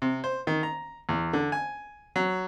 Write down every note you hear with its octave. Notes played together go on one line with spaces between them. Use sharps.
C3
C5
D#3
A#5
E2
D3
G#5
F#3